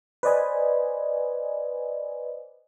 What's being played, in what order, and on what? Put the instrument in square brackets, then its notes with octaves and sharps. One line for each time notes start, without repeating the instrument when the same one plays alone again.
[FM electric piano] B4 C5 D5 D#5 G#5